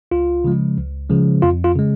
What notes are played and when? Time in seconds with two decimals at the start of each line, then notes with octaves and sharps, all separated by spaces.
0.11 C#2 F4
0.44 C#3 F3 G#3
0.78 C#2
1.09 C#3 F3 G#3
1.42 F2 F4
1.64 F4
1.76 C#3 G#3